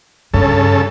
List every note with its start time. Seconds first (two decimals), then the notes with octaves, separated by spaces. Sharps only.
0.34 G2 C#3 A4